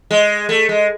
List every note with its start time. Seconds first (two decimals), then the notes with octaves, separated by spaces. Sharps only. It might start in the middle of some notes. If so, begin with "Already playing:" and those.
0.11 G#3
0.49 A3
0.69 G#3